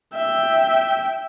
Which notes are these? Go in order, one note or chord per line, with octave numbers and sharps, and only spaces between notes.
E5 G5